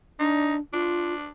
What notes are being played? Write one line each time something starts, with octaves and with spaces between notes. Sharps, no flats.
D4 D#4
D4 F4